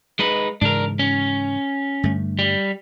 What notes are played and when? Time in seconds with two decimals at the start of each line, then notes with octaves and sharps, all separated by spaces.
0.19 G#3 D#4 B4
0.61 G#2 C#3 E3 D4 A#4
0.99 C#4
2.03 G2 D3 A3
2.39 G3